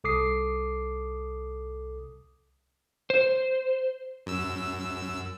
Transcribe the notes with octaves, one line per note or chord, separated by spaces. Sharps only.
C2 A4 D6 D#6 C7
C5
F#2 E6